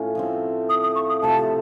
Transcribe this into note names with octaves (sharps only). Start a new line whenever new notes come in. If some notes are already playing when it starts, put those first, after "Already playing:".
Already playing: A2 C#4 F4
F3 A3 C4
D#6
D#6
C#6
D#6
C3 F3 A3 A5